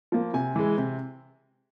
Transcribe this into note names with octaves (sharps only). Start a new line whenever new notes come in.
F3 A#3
C3 G#5
E3 G#3
C3